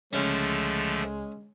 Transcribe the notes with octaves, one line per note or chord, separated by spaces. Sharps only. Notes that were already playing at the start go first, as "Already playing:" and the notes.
C#2 D3 F3 G#3 A3 C#4